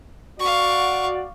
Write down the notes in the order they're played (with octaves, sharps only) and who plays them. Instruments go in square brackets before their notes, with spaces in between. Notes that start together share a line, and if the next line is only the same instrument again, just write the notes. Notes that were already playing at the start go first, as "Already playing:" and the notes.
[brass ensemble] F#4 D5 [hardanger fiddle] F5 C#6